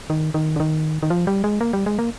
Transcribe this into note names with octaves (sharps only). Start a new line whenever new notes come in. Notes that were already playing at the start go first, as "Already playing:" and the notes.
D#3
D#3
D3
D#3
D#3
F3
G3
G#3
A#3
G3
G#3
A#3